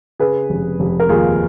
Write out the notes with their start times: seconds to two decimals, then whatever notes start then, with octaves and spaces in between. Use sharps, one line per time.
0.19 C#3 G#4 B4
0.50 F1
0.80 F1
1.00 A#4
1.09 D#2 F4 G#4